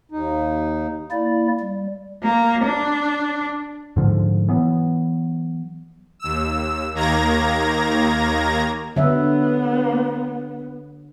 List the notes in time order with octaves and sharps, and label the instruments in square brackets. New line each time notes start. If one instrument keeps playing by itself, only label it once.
[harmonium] D#2 D#4
[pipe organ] A#3 E4 D5
G3
[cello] A#3
D4
[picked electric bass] G#2 D3 F3
E3 F#3 B3
[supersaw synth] D#2 E6
D#2 D#3 A#3 A#5 G#6 A#6
[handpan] D3 F#3 E5 [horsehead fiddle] B3